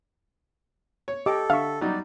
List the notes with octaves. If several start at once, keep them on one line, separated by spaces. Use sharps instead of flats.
C#5
G4 A4 D#5 D6
D3 E5 F5 C#6
F#3 G3 D#4 D5